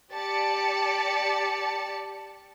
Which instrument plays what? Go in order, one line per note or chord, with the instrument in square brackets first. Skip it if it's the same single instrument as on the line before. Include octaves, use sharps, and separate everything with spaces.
[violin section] G4 D5 A5 C#7